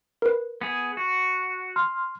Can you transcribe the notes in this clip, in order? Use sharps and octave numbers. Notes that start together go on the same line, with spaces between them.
A#4 B4
B3 G#4
F#4
C6 F6